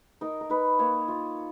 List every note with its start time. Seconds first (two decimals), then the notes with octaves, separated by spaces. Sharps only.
0.21 D#4 A#4
0.41 A#4
0.50 D#4 B4
0.79 A#3 C#5
1.08 F4